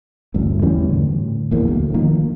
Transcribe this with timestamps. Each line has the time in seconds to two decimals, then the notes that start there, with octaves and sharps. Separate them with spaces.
0.34 A1 D2 G2
0.62 E2 E3 G3 C#4
0.89 A2 D3
1.51 D#1 A#1 E2 A#3
1.68 D2
1.94 D#3 F3 A#3